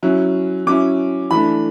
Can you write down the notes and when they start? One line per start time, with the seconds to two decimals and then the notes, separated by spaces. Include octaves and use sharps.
0.03 F#3 C#4 E4
0.67 F#3 C#4 E4 D6
1.31 E3 A3 D4 B5